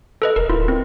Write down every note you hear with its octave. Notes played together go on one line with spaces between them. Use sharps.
A4 B4 D#5
E1 A#4
D1 E4 F4
C4